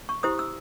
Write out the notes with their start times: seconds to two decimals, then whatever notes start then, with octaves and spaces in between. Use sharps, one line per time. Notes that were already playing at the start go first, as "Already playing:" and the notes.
0.09 C#6
0.23 E4 G4 C5 D#6
0.39 E6